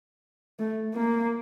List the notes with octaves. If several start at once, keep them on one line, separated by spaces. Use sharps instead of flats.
A3
A#3